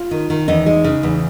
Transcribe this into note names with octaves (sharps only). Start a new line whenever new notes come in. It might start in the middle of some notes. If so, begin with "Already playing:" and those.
Already playing: F4
D#3
D#3
E2 D#4
G#3
C#3
E2